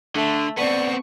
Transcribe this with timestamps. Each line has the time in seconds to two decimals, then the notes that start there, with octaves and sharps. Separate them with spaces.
0.16 D3 A3
0.59 B3 C4 D5 C#6